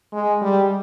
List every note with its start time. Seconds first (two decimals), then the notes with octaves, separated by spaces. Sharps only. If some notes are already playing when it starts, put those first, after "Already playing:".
0.13 G#3
0.42 G3